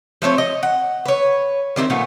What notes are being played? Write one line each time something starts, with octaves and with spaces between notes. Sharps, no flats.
F3 A3 C4 C#5
D#5
F#5
B4 C#5
D#3 C4 D4 E4
A#2 F3 A3 B3